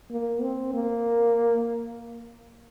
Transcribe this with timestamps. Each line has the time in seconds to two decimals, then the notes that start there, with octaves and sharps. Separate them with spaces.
0.11 A#3
0.42 C4
0.74 A#3